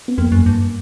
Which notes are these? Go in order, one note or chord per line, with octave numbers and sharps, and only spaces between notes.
B3
F2 A#3
F#2
G2